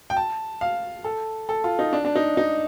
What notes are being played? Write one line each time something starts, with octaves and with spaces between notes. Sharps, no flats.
G5
A5
F5
A4
A4
F4
D#4
D4
D4
D#4
D#4